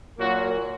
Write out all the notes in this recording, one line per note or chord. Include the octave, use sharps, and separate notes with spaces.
A#2 F#3 A#3 F#4